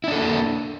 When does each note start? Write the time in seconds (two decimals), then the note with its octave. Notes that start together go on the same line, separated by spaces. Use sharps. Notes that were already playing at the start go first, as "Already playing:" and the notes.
0.04 E4
0.08 D4
0.12 A4
0.16 A#3